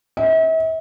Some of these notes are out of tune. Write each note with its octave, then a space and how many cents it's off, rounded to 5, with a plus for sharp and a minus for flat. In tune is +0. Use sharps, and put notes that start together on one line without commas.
E5 -40